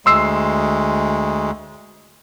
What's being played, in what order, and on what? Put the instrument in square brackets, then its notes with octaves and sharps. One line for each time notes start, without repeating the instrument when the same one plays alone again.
[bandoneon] D2 G#3 [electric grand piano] C6 E6 C7